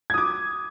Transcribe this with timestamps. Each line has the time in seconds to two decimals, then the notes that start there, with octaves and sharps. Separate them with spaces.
0.10 G#6
0.14 D#6
0.18 D6